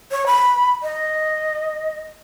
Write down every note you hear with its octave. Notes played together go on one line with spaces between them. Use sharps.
C#5
B5
D#5